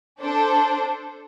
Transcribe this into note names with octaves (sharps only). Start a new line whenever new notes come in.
D4 A4 C5